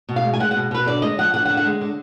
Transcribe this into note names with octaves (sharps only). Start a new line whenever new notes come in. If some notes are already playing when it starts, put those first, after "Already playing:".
B2
F5
G#3
G#5
G#3 F#5
B2 F#5
B2 B4
D3 D5
G#3 D#5
F3 F#5
D3 F#5
F#5
D3
F#5
G#3
D3